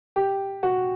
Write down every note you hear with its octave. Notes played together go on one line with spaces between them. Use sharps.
G4
F#4